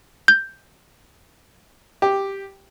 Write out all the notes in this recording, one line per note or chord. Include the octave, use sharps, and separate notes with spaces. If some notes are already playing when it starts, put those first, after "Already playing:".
G6
G4